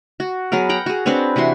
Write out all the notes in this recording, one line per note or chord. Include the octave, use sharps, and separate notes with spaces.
F#4
F#3 B3 G#4 A#4
F#5 G5 A#5
F#4 G#4
C4 D4 B4 C#5
C3 E3 F#4 C6